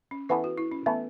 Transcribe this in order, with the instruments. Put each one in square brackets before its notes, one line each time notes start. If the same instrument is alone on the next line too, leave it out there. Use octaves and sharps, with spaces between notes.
[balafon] C#4
[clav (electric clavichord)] E3 B3 A4 E5 [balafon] E4
[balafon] F#4
E4
C#4
[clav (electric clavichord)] E3 A3 E4 [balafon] B3